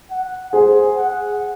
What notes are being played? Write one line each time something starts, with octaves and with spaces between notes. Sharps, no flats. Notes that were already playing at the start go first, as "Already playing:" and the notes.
F#5
G#4 C5
F#5